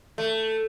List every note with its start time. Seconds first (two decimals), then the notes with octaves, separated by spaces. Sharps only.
0.18 A3